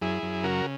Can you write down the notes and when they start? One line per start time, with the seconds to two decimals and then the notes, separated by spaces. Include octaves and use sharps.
0.01 F#2 E4 G#4
0.23 F#2
0.43 C#3 F#4 A#4